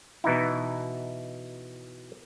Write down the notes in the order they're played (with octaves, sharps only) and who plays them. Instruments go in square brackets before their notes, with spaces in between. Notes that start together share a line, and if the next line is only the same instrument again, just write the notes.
[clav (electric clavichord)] B2 E3 D#4 E4